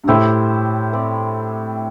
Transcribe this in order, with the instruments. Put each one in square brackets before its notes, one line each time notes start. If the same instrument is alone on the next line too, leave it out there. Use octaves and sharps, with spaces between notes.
[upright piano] G2
[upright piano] A2 [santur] E4 G4 C5 E5
[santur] C4 G4 D5